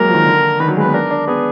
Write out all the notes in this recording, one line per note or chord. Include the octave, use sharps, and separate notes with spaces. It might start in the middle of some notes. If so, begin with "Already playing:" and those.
Already playing: F#3 G#3 A#3 A#4
F3
D#3
D3
D#3 B4
F#3
G#3
B4
B3
D4 A#4
D4
B3 G#4